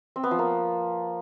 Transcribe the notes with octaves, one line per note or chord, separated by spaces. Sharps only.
C4
B3
F3
A#3